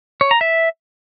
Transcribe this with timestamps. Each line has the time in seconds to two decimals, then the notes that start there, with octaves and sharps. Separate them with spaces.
0.21 C#5
0.31 A#5
0.41 E5